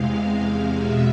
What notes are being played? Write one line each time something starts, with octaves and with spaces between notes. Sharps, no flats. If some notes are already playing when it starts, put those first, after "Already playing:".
Already playing: E2 C3 G#3 F5
E2 B2 G#3 E5